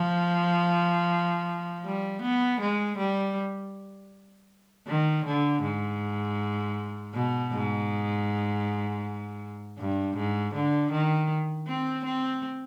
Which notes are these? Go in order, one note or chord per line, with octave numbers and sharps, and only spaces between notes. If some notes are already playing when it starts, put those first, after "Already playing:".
Already playing: F3
G3
B3
G#3
G3
D#3
D3
G#2
B2
G#2
G2
G#2
D3
D#3
C4
C4